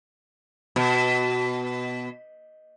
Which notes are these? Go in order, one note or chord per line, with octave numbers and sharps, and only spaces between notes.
B2